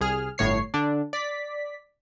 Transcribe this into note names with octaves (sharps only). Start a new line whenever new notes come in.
C2 G#4 F6
G1 A2 C#5 C7
D3 D4
D5 B6